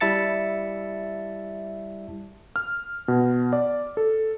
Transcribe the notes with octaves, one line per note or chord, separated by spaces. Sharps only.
G3 E4 E5 A5 A6 C#7
F6
B2
D5
A4